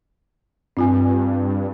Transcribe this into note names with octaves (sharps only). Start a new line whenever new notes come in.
G2 C4 F4 G#5